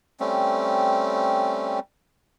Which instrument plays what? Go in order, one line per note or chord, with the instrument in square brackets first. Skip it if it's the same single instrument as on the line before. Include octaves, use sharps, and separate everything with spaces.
[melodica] G3 A3 C4 C#4